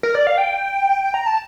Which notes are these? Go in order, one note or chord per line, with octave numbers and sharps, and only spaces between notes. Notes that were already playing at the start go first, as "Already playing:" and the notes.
A#4
D5
F5
G5
A#5
A5